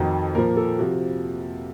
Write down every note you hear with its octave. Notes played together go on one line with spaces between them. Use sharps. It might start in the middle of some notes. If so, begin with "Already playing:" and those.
Already playing: F2 D#3 F#4
A#2 F3 A#4
A4
C3 F3 F#4